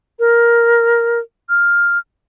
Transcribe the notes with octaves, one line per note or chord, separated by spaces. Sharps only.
A#4
F6